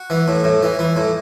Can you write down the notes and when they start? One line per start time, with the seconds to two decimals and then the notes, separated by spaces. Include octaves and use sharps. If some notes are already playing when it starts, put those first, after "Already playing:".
Already playing: F#4
0.10 E3
0.28 A2
0.44 A2
0.63 E3
0.79 E3
0.96 A2